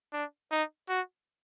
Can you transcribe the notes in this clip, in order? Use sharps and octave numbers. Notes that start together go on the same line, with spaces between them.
D4
D#4
F#4